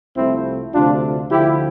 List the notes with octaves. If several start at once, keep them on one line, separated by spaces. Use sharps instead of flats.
C2 C3 F3 A3 C4 E4
D2 C3 F3 A3 D4 F4
D2 D3 F3 E4 G4